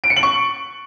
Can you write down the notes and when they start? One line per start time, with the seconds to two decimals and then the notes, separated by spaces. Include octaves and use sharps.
0.04 D7
0.10 C#7
0.16 F#7
0.23 C#6